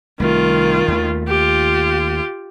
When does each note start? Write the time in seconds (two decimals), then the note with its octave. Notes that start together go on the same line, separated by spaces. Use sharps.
0.20 C2 D#3 A3 F4
0.88 D#2 A3
1.28 F4 G4